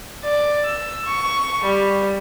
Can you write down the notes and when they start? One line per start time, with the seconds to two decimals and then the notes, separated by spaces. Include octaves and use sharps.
0.23 D5
0.65 E6
1.05 C#6
1.63 G3